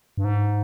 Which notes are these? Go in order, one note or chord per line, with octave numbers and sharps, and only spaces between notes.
G2
G#2